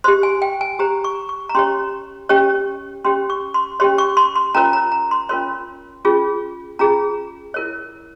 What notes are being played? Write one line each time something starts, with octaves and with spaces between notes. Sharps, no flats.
G4 C5 C6
G#5
G5
G#5
G4 C5 A#5
C#6
C#6
A#5
C#4 G4 C#5 C6
C#4 G4 C#5
C#4 G4 C#5 C6
C#6
C6
C#4 G4 C#5 C6
C#6
C6
C6
C#4 F4 A#4 C#5 A#5
A#5
A#5
C6
C#4 F4 A#4 C#5 C6
C#4 F4 G#4
C#4 F4 G#4 A#5
E4 A#4 C#5